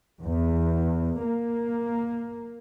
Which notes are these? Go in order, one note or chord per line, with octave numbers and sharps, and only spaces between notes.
E2
A#3